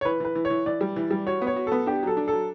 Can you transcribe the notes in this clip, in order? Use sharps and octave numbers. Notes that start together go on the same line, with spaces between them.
C#5
E3 B4
E3 B4
E3
C#5
E3
E3 D5
G3
E3
G3
F#4 C#5
B3
C#5
F#4
B3 A4
D4 G4
F#3 A4
D4
F#3 A4